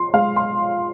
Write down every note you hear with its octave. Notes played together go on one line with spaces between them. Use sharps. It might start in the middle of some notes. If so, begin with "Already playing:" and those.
Already playing: F3 C6
G#3 F5
C6